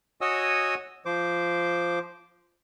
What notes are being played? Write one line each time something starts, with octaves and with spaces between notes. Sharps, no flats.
F#4 C#5 D#5 G#5 D#6 E6
F3 C5 D6